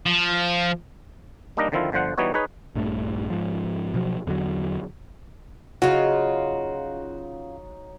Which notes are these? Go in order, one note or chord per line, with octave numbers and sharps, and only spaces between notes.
F3
G3 A#3 D4 D#4 A#4 D#5
D3 D#3 F3 C4 E4 F4
G1 D3 F3 C5 F#5
E3 G3 B3 D#4 F#4 C#5
D#4 G#4 B4 C#5
A#1 G2 A3
G#2 F3
B2 F3 F#3
E2 D3 F3 F#3
C#3 F#3 D#4 F4 F#4